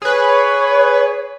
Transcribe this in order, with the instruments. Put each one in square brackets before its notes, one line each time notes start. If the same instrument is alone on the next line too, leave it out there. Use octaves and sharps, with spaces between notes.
[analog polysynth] G#4 B4 [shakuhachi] C#5